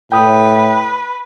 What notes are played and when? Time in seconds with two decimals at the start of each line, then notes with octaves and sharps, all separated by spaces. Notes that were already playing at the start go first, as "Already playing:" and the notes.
0.12 A2 B4 G5 D#6